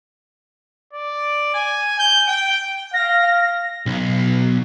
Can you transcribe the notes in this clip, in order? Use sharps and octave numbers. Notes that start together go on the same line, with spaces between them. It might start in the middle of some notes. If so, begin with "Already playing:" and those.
D5
G#5
G6
G5
F5 A#6
B1